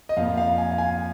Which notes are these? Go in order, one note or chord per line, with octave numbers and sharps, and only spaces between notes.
D#5
F2 F3 A#3 F5
F5
G#5
F5
G#5